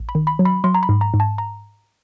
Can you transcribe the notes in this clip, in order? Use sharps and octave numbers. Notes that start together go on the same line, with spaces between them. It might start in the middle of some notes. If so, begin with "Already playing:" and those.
Already playing: A1
B5
D#3
B5
F#3
B5
F#3 C6
A#5
B5
G#2
A#5
G#2
A5
A#5